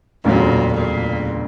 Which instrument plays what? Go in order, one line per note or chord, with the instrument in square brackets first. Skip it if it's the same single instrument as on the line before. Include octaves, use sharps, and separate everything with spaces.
[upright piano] E1 D2 C#3 F#3 [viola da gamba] A#2
[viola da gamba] A#2